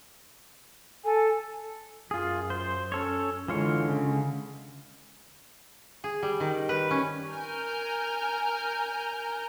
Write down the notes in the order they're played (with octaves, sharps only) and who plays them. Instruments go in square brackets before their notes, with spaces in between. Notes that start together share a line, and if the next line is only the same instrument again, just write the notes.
[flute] A4 [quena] G#5
[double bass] F#2 [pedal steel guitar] F4 G#4
[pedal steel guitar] C5
C#4 A4 C#5
[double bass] D3 G#3 [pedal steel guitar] E3 F4 C#5
[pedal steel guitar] C#3
[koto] G#4
G3
D#3
B4
C#4
[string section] A#4 G#5 F6 G6